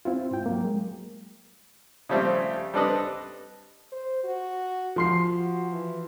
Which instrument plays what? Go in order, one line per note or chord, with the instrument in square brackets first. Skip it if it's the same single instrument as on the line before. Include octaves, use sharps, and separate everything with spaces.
[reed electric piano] C4 E4 F4
G#2 G5
F#3 A#3
G#3
[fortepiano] C#3 F3 G3 A3 C4
G3 C4 D4 A4 B4 D#5
[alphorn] C5
F#4
[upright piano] F3 C6 C7
[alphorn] F#4
E3